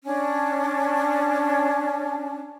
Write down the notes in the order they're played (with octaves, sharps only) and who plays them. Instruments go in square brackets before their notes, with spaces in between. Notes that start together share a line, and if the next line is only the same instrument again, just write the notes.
[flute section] C#4 D4